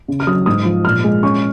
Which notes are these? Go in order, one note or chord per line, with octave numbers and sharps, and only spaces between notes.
C#3
F6
F#3 D#6
G#2 D#6
F3
A#2 F6
G#3
C#4 C#6